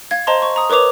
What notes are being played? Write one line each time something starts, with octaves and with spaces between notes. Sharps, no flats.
F5 G#6
C5 D#5 A5 A#5 C6
C#6
A#5 D#6
A#4 B4 C#5 D6 F7